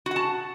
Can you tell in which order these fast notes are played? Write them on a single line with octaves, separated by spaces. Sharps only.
F#4 F#5 A5